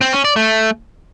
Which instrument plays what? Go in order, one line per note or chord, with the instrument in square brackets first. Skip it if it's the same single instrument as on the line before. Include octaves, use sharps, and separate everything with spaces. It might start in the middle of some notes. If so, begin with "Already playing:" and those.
[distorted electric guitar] C4
C#4
D5
A3